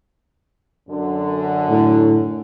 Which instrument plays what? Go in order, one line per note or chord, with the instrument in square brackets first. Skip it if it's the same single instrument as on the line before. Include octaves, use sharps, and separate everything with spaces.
[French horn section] F#2 D3
[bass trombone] A2